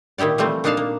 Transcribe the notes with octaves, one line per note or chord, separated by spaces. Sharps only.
A#2 D#3 E4 G4 D5
E3 F3 G3 A3 C4
A#2 D4 D#4 D5 F5 A5
A#3